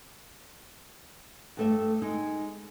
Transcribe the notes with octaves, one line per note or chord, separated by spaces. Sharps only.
G2 A3 E5
G#3 D#4